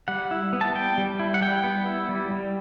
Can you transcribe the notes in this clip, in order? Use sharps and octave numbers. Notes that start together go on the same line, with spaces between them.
G3 F#5
E4
B3
A5
G3 G5
G3
E4
F#5
G3 G5
B3
E4
G3
G3